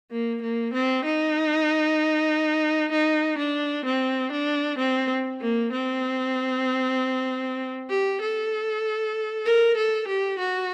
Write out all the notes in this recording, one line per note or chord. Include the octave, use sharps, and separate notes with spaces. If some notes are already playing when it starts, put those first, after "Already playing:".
A#3
A#3
C4
D#4
D#4
D4
C4
D4
C4
A#3
C4
G4
A4
A#4
A4
G4
F#4